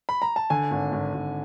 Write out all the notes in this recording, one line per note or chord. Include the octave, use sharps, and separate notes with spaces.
B5
A#5
A5
D3 G#5
G#1
G#1
G#1